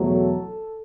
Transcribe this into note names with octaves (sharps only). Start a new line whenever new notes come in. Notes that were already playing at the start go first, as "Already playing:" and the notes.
Already playing: E2 B2 F#3 A3
A4